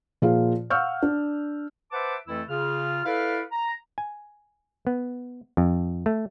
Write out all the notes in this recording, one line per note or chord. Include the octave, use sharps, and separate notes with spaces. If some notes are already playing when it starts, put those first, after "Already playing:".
A#2 F3 F4 G#4 F5
F5 F#5 C#6 E6 F6 G6
D4
B4 C5 E5 F#5 A5 D6
F2 E3 A3 E4 E6
C#3 F4 F6
E4 A4 B4 D5 F5
A#5
G#5
B3
F2
A3